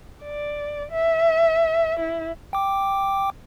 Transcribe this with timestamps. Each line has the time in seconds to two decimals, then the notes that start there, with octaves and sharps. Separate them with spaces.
0.23 D5
0.92 E5
1.99 E4
2.53 G5 D6